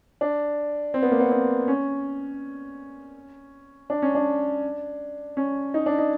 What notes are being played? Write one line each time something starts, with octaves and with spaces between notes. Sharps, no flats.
D4
C4
B3
A#3
B3
C4
C#4
D4
C#4
D4
C#4
D#4
D4
D#4